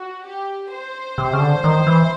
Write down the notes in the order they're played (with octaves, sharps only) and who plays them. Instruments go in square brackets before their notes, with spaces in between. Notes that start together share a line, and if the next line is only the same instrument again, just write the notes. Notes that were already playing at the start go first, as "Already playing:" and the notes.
Already playing: [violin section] F#4
G4
C5
[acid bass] C3
C#3
D3
D#3
E3